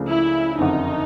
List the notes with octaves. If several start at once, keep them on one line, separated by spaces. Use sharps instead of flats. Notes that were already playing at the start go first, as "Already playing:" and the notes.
Already playing: C#2 C#3 F3 A3 D4
E4
F#1 F2 D3 D#4